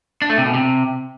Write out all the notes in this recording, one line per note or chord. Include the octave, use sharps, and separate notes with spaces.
D4
A3
C3
B2
C3